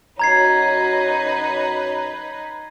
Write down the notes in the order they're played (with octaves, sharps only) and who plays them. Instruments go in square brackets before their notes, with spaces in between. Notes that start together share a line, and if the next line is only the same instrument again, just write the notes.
[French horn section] F#2 F#4 C#5 [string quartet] D#4 B4 [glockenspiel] A#5 G#6 C7